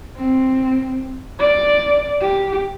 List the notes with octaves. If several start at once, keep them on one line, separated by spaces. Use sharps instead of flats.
C4
D5
G4